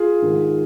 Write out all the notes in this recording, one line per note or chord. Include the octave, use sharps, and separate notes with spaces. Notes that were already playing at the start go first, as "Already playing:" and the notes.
Already playing: F4 G#4
G#2 D#3